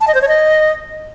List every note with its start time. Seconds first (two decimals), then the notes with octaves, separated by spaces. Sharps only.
0.01 A5
0.08 D#5
0.15 C5
0.21 C#5
0.28 D#5